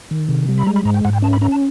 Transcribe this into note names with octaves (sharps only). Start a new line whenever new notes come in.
D#3
C3
G3
B5
G#3 A#5
B5
G#2 A#5
G5
G#2 F#5
G5
C#4 A5
B5
C#4 A#5
A5